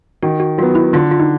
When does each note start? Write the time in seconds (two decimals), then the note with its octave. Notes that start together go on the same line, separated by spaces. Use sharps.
0.23 D#3 F#4
0.40 F#4
0.58 F#3 F4
0.62 B3
0.75 E4
0.93 D3 F4
1.11 F4
1.20 D#4